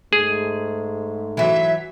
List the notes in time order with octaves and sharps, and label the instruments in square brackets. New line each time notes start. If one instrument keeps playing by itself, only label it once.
[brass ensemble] G#2 A3 [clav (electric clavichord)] G#4
[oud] E3 F#3 [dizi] E5